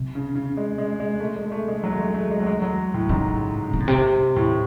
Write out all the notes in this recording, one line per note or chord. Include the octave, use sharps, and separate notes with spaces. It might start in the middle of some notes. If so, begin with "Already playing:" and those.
Already playing: C3
C#3
C#3
G#3
G#3
G#3
A3
G#3
A3
G#3
F#3
A3
G#3
A3
G#3
F#3
G#3
F#3
A2
G#2 C#3
C3
A2
C3
A2